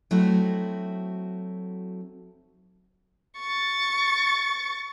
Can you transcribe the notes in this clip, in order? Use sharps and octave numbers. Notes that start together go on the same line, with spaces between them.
F#3 A3 C4 D#4 E4 F#4
C#6 A6